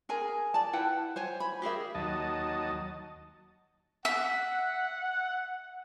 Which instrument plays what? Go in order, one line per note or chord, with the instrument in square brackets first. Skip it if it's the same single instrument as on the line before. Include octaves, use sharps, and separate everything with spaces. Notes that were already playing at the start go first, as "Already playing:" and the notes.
[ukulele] G#4 A#4 G#5 A#5
D5 A5
E4 B4 F#5 G5
C5 C#5 G#5
B5
G4 G#4 A#4 E5
[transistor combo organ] D#2 F#3 D#5 A5
[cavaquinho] E5 [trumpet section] F#5